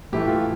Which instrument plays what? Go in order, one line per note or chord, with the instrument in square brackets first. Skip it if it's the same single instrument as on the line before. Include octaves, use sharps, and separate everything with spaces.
[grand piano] A2 E3 A3 G4
F4